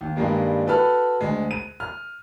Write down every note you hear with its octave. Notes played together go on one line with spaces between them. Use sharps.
D#2
G2 D#3 G3 G#3 A#3
F#4 A4 B4 A5 B5 F6
D2 G#3
D#7
F6